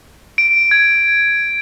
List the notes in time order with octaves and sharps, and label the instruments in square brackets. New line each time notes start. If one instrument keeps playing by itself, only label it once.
[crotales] D7
G#6